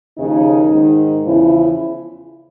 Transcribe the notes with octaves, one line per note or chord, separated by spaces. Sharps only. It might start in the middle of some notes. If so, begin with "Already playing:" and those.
D#2 C#3 F3 D#4
G#2 D#3
E2 C#3 F3 E4